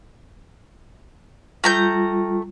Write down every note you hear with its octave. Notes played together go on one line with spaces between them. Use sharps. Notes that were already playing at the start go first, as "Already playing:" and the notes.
G3 A3 F4 A#5 G6